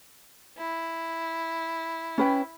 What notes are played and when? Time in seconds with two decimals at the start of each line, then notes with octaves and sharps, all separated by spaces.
0.58 E4
2.18 C#4 B4 G5